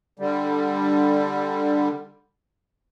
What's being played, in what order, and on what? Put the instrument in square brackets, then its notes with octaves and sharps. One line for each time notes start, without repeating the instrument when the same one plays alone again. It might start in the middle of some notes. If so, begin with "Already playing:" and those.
[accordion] D3 G3